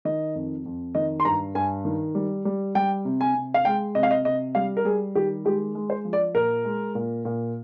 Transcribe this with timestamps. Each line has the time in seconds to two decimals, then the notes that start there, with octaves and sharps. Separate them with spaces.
0.05 D#3 D#5
0.35 F2
0.65 F2
0.95 D#3 D#5
1.20 C6
1.25 G2 A#5
1.55 G2 G#5
1.85 D#3
2.15 G3
2.45 G3
2.75 G3 G5
3.05 C3
3.21 G#5
3.35 C3
3.54 F5
3.65 G#3 G5
3.95 C3 D#5
4.03 F5
4.11 D#5
4.25 C3 D#5
4.55 G3 F5
4.77 A#4
4.85 G3 G#4
5.15 D#3 G4
5.45 G#3 G4
5.75 G#3
5.90 C5
6.05 F3
6.13 D5
6.35 A#2 A#4
6.65 G#3
6.95 A#2
7.25 A#2